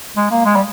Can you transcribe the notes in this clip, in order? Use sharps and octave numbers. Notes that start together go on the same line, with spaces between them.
G#3
A#3
G#3
G3